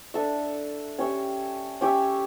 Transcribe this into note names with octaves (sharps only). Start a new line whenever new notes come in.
D4 A4 E5
C#4 G4 C#5 E5
C#4 G4 C#5 E5